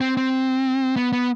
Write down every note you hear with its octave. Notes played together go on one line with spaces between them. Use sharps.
C4
C4
B3
B3